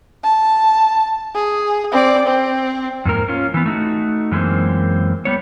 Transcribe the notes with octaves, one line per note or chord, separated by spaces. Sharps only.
A5
G#4
C4 D5
C4
F2 G#2 A#3 A#4
C#4 F4
E3 B3
A3 D#4 F#4
F#2 E3 G#3 A#3 C4
G3 B3 C#5